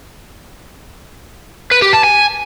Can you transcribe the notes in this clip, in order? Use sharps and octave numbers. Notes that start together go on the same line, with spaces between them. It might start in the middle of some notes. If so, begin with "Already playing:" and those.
B4
G4
A5
G#5